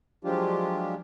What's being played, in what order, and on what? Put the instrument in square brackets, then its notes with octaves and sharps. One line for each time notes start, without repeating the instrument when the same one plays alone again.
[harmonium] F3 F#3 G#3 D4 F4 G4